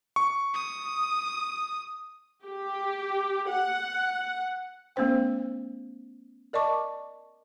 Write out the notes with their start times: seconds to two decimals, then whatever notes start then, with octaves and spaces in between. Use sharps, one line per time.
0.16 C#6
0.54 D#6
2.44 G4
3.50 F#5
4.96 A3 B3 C#4 C5 G5
6.53 A#4 D5 D#5 A5 C#6 D6